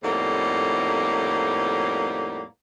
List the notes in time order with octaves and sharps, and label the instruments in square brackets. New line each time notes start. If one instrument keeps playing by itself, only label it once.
[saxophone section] F2 A2 G3 A#3 B3 D#4